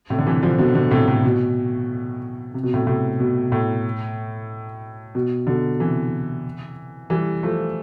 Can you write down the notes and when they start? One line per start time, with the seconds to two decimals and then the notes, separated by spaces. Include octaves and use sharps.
0.10 A2 C3
0.19 D3
0.27 C3 E3
0.43 D3 F3
0.58 B2 D3
0.74 B2 D3
0.91 A2 C3
1.08 A2
1.24 B2
2.54 C3
2.63 B2
2.73 A2 C3
2.86 A2 C3
3.20 B2
3.52 A2
5.15 B2
5.47 B2 D3
5.79 C3 E3
7.10 E3 G3
7.43 F3 A3